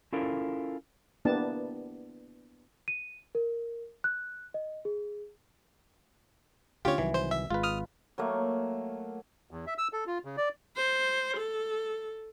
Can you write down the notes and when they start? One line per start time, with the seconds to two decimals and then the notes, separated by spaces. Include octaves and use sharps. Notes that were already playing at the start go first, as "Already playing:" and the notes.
0.13 C#4 E4 F4 A4 A#4
1.25 A#3 B3 D4 E4 G4 A5
2.88 D#7
3.35 A#4
4.04 F#6
4.54 D#5
4.85 G#4
6.85 D2 D3 C#4 F4 G4 C#5
6.98 C2 D#3 E3 F#3
7.14 C5
7.31 E5
7.50 G#1 G#3 F4 B4
7.63 D#6 F6
8.18 F#3 A3 A#3
9.51 E2
9.67 E5
9.78 E6
9.93 A4
10.07 F4
10.25 C#3
10.37 D5
10.76 C5
11.37 A4